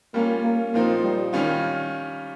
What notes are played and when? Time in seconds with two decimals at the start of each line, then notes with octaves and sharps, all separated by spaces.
0.14 G3 A#3 C#4 F4
0.43 A#3
0.74 A#2 F3 A#3 C4 D#4
1.03 G3
1.33 D#3 G3 C#4 F4